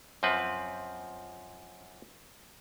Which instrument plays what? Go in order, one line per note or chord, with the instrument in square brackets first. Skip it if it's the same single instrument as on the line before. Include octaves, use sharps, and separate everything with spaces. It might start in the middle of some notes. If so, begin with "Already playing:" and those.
[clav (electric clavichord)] F#2 F3 C4 B4